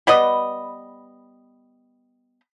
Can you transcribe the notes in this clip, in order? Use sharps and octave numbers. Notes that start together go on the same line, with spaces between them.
G3 B3 B4 D#5